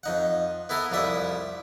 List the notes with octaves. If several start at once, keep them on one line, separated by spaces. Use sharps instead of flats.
F2 D#4 F#5
B3 E4 A4 A#4 D#6
C2 F2 G3 E4 E5 D#6